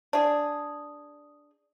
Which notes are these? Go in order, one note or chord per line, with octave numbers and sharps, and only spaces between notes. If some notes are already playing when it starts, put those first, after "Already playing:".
D4 G#4